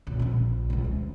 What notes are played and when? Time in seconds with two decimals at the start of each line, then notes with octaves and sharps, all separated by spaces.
0.07 C#2 A#2
0.19 A#1 C4
0.70 D1 C#2
0.84 D2